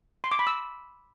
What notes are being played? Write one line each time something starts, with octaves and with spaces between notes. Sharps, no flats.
C6
D6
B5
E6